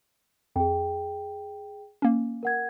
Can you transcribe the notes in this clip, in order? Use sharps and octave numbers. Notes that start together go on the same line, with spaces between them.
F2 G#4 G5
A#3 C#4
A#4 F#5 G#6